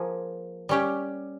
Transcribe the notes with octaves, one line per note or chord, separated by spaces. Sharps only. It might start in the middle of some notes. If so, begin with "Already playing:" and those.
Already playing: F3 A#3 G#4
G3 C#4 G4